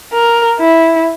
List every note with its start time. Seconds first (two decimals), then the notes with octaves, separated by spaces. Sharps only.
0.13 A#4
0.59 E4